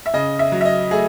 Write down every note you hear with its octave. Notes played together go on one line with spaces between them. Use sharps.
E5
C#3 D#5
E5
F#3
E5
D#5
A3 G#4